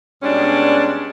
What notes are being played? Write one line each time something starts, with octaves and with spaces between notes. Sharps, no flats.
B2 G3 G#3 C#4 D4